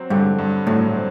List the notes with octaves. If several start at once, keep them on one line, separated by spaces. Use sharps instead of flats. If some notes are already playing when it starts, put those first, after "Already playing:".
Already playing: F#3 C4
G2 D3
G2
A2 F#3
C4